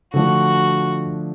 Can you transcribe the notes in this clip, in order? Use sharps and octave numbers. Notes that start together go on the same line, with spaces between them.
D3 F3 A3 D4 F#4